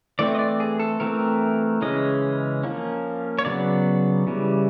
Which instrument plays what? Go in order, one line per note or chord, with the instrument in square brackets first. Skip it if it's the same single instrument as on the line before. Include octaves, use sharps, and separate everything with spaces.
[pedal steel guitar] E3 A3 C4 D5
D#5
D5
G#4
A4
E3 A3 C4 A#4
C#3 E3 G#3 C#4 D#5
F3 A#3 C#4
C#5
C#3 F#3 B3 D5
C#3 E3 G3